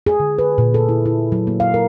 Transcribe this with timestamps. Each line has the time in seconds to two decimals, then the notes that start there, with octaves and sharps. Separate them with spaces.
0.06 G#4
0.20 D3
0.39 B4
0.58 A#2
0.74 A4
0.89 E4
1.06 E4
1.32 F#3
1.47 A#3
1.60 F5
1.74 A#4